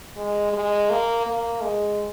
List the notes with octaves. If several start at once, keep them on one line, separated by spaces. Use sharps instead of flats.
G#3
G#3
A#3
A#3
G#3